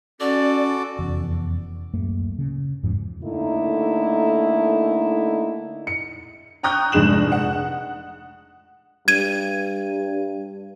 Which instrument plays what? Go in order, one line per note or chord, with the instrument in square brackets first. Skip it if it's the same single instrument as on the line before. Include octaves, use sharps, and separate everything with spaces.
[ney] C#4 [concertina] F#4 A4 D6 [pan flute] D5
[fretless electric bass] F1 E2
D1 F#2 A3 A#3
C#3
E2 G#2 C#3 F3
[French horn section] D3 A3 A#3 D#4 E4
[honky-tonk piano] C#7
G5 A#5 C#6 D#6 F#6 G6
F1 A#1 G#2 G#4 E7 F#7
F#5
[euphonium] G2 [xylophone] G#6 D#7